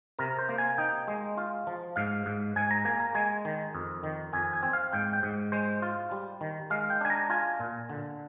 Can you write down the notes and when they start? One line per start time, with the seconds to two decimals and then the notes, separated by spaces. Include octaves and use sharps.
0.19 C3 A#4
0.39 C5
0.49 A#3
0.58 G#5
0.78 D#4 G5
1.08 G#3
1.37 F4
1.67 F3
1.96 G#2 F5
2.26 G#2
2.56 G#2 G#5
2.71 A#5
2.85 A#3 G#5
3.00 A#5
3.15 G#3 G#5
3.45 D#3
3.75 F2
4.03 D#3
4.33 F2 G#5
4.53 G#5
4.63 C4
4.73 F5
4.93 G#2 G5
5.13 G5
5.23 G#2
5.52 G#3 C5
5.82 F4
6.11 G3
6.41 D#3
6.70 G#3 F5
6.90 G5
7.01 D4 G#5
7.10 A#5
7.30 F4 G#5
7.60 A#2
7.89 D3